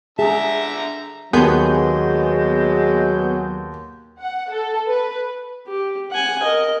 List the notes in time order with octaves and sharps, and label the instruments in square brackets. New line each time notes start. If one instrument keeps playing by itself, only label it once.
[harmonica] D3 A#5 [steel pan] G#4 [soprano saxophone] E5
[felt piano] D#2 [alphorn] F#3 [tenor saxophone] G#3 [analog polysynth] B3 G#4 G6
[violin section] F#5
A4
B4
[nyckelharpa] G4
F#5 G#5
A#4 D#5